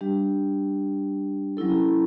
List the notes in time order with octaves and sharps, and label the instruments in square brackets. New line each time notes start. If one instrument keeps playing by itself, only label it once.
[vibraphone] G3 D4 G4
F#3 C#4 E4 A4